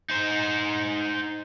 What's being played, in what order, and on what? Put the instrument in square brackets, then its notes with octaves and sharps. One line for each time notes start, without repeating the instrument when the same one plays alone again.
[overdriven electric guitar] D#4 C5